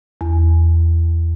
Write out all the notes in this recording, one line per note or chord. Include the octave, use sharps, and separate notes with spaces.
E2